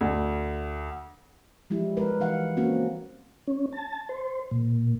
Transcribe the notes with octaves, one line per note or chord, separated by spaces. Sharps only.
D2
F3 G3 G#3 E4
G#3 A#4 B4
E3 D#4 F5 F#5
A#3 C4 C#4 F#4
C#4
A5
C5
A#2